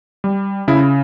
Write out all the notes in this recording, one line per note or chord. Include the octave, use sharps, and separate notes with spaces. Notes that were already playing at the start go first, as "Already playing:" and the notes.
G3
C#3 E4